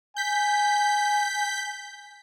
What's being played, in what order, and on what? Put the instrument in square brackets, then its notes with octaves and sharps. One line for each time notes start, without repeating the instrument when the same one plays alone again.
[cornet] G#5 [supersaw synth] G6 B6